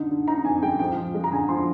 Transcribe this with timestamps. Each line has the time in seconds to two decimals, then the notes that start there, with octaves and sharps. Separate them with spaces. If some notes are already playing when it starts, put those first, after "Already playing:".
Already playing: D3 D#4
0.11 D3
0.28 D#4 A#5
0.45 F2 G#5
0.62 G#3 G5
0.79 F3 G5
0.97 F3
1.14 G#3
1.24 A#5
1.32 D3 G#5
1.49 F3 C6